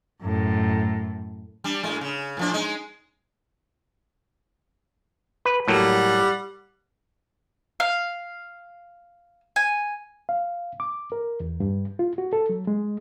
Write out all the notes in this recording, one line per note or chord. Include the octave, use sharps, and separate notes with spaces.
F#2 A2
G3 D4
A2 G#3
C#3
A2 F3 D4
G#3 D#4
B4
A2 F#3 G3 A#3 F#5
F5
G#5
F5
D6
A#4
E2
G2
F4
F#4
A4
F#3
G#3